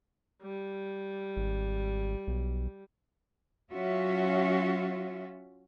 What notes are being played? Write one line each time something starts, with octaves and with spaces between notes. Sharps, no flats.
G3
G#1
B1
F#3 C#4 F4 F#4 E5